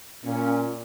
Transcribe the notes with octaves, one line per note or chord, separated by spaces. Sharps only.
A#2 C#4